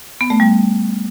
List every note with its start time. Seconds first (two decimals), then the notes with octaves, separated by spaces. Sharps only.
0.21 B3
0.30 A3
0.40 G3